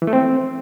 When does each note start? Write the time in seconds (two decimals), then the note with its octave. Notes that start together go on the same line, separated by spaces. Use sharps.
0.02 E3
0.07 A3
0.13 C4